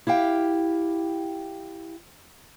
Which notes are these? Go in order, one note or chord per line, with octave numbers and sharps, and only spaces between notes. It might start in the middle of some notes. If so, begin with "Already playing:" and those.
E4 G4 F5 G5